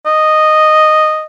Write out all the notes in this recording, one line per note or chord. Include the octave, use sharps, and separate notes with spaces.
D#5